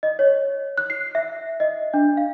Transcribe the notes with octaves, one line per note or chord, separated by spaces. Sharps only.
D#5
C#5
F#6
C7
E5
D#5
D4
F5